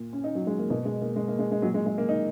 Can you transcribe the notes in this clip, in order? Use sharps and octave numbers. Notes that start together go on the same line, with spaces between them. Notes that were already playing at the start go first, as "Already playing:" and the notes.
Already playing: A#2
C#4
D#4
F#3
G#3
A#3
B2 A#3
G#3
A#3
G#3
A#3
G#3
G#3
A#2 F#3
G#3
G#3
A#3
D#4